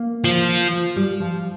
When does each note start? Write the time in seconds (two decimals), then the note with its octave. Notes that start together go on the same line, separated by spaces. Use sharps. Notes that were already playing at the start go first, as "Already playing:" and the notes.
Already playing: A#3
0.24 F3
0.96 G3
1.20 F3